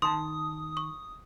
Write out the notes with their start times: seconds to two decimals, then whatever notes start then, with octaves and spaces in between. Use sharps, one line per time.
0.02 D#3 A5 C6 D#6
0.77 C#6